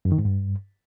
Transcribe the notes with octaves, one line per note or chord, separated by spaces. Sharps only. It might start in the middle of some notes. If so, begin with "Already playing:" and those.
F#2
D#3
G#2
G2